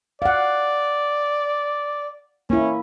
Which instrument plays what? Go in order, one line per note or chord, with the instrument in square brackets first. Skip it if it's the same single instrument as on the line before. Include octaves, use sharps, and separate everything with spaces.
[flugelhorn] D5 [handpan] F5 F#5
[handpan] A#3 E4 [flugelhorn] C#4